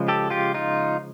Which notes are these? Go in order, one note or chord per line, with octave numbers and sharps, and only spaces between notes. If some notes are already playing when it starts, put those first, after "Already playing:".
Already playing: C#3 F3 G#3
G4 A4
F4 G4
D#4 F4